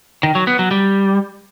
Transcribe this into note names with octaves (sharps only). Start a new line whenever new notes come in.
D#3
F#3
B3
F#3
G3